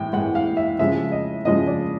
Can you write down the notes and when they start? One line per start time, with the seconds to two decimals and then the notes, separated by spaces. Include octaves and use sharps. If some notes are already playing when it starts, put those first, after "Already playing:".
Already playing: A2 E3 G#3 G5
0.13 A2 E3 G#3 F#5
0.35 F5
0.57 E5
0.79 C#3 F3 G#3 E5
1.12 D#5
1.45 C#3 F3 G#3 D#5
1.67 D5